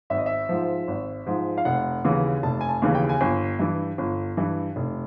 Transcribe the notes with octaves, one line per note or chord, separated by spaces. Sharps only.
G#1 E5
D#5
E5
G#2 F3
G#1
G#2 F3
F5
F1 F#5
D#2 C#3 E3
F1 A5
G#5
A5
D#2 C#3 E3
G5
G#5
G1 G5
G2 E3
G1
G2 E3
F1